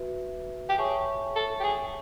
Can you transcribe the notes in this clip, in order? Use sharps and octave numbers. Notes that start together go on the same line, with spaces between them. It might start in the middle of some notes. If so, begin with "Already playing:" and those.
Already playing: F#4 B4 E5
G4
G#4 C#5 E5 A5 C#6
A4
G4
G#4